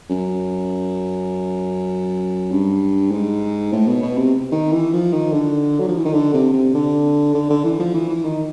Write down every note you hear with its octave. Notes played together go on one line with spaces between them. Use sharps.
F#2
G2
G#2
A2
B2
B2
C3
D#3
E3
F3
D#3
D3
F#3
F3
E3
D#3
D3
C3
C3
D3
D3
D3
E3
F3
E3
E3
D#3